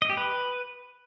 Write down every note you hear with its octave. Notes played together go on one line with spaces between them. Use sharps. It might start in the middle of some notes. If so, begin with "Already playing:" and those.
D#5
G4
B4